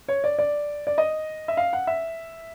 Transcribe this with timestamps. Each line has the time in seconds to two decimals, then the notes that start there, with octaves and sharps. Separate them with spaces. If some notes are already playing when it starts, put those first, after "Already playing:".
0.08 C#5
0.24 D5
0.39 D5
0.87 D5
0.98 D#5
1.48 E5
1.57 F5
1.73 F#5
1.87 E5